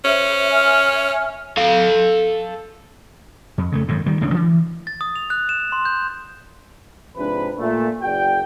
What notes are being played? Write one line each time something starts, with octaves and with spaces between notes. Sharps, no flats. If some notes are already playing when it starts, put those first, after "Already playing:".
C#4 C5 E5
E5 G#5 F6
A4 F5
F2
C#3 G3 A3
G#1 F#2 A2
D#3 G3
C#2 A2 C#4 D4
E3
A6
D#6
F7
F#6
E7
C6
G6
G#2 C3 F3 D4 B4
A#2 A3
F#1 F#4 G#4 D5 G5